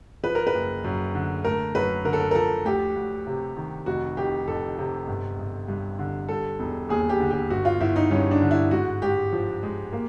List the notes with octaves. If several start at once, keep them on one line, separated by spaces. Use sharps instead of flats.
F3 B4
A#4
B4
F#1
F#2
D3
A3 A#4
F#2 B4
D3 A#4
A4
A#4
A#4
F3 A4
D2 G4
D2
C3
D#3
F1 F#4
F1 G4
F2 A4
C3
G1
G1
G2
D3
G3 A4
E1
D#2 G#4
G4
D3
G4
G1 F#4
F4
G1 E4
D#4
G2 C#4
D4
D3
E4
G#2 F#4
G#2 G4
F3
G#3
A#3